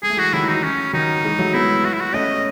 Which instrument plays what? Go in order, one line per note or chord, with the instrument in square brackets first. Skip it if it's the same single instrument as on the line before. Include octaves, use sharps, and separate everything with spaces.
[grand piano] G#3 [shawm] G#4
[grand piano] A3
[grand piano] E3 G#3 [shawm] F#4
[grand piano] D#3 F#3 [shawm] E4
[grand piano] E3
[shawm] D#4
[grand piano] E3
[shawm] C#4
[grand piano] D#3 F#3 [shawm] D#4
[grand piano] E3 G#3
F#3 A3
[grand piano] G#3 B3 [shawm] E4
[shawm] F#4
E4
F#4
[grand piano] A3 C#4 [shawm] D#5